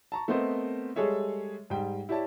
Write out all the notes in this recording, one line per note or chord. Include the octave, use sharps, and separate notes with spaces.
A5 A#5 C#6
A3 B3 C4 A#4 C5 D#5
G3 G#3 G#4 A4 C#5 E5
G#2 G3 G5
E4 G4 C#5 D5 A5